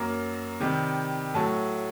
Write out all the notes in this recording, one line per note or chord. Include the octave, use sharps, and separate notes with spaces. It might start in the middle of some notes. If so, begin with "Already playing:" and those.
Already playing: F#2 F#3 A#3 A#5
C3 D#3 G3
A2 F#3 A3 A5